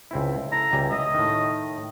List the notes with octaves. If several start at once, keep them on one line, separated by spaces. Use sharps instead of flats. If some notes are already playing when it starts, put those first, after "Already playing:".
C#2 C4 E4
E4 A4 A#5
C#2 G3 G#5
D#5 E5
A2 D#3